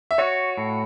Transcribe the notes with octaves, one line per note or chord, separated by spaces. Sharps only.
E5
F#4 C#5
A2